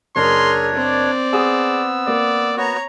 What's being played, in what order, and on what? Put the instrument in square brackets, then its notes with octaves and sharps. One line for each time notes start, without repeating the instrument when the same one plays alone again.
[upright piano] F#1 [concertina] D4 C#5 [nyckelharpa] G#4 A#4 [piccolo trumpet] C6
[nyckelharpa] C4 [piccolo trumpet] D5
[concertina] B3 E6 [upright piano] G#4 D#6
[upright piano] A#3 [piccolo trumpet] D5
[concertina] B3 F#4 [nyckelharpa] C#5 A#5